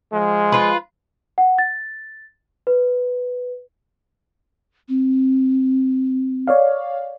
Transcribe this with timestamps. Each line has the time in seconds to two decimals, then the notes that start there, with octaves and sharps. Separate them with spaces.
0.12 F3 G#3
0.52 F4 B4
1.38 F#5
1.58 A6
2.67 B4
4.89 C4
6.47 C#5 D5 F5